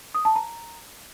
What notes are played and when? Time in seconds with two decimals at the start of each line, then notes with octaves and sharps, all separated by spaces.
0.15 D#6
0.25 A5
0.36 A#5